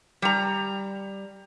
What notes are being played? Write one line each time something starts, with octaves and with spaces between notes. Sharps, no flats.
G3 A#5